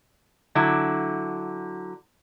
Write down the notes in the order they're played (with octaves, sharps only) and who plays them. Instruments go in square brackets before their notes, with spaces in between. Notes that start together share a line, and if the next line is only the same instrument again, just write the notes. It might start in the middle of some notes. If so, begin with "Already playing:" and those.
[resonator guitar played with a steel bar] D3 F#3 E4